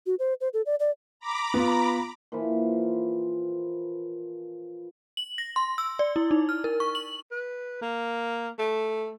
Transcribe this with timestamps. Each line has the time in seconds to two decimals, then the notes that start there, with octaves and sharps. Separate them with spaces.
0.06 F#4
0.19 C5
0.41 C5
0.54 A4
0.66 D5
0.80 D5
1.19 A#5 B5 D6
1.54 B3 F4
2.32 A#2 E3 F3 B5
5.17 F#7
5.38 A#6
5.56 C6
5.78 E6
5.99 D5
6.16 E4
6.31 D#4
6.49 F6
6.64 A#4
6.80 C#6
6.95 F#7
7.31 B4
7.82 A#3
8.58 A3